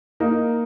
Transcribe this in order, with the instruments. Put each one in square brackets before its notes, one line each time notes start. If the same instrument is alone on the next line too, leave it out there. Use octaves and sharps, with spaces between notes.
[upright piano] A#3 D#4